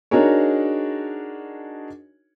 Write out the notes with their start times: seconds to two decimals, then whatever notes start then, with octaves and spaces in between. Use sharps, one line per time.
0.11 D4 D#4 F#4 G#4 A#4 C#5